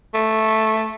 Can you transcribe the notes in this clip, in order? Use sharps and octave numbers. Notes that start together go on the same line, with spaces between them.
A3